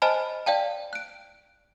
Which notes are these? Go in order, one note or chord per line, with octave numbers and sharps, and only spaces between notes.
C5 D#5 G#5 A5 B5 F6
D5 F5 G5 A5
F#6 D7